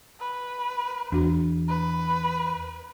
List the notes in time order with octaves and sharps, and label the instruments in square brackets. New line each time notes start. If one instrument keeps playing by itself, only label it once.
[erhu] B4
[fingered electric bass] E2 [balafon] D4 F#4
[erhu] B4